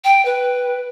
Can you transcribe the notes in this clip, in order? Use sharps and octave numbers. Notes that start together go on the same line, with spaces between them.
G5
B4